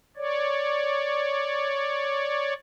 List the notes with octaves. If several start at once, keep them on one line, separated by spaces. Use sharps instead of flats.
C#5 D5